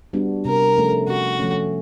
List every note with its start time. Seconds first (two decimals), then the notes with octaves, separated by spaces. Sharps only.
0.13 G3 B3 D4 F#4
0.45 C3 A#4
0.77 F3 A3 C#4
1.08 C3 F#4
1.39 F3 A3 C#4